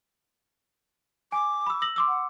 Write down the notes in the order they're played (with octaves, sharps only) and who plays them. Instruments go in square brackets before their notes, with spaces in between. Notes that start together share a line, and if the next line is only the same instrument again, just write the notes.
[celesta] G#5 [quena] D6
[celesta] B5 E6
E6 A#6 F#7
C6 D6 E6
[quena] F#5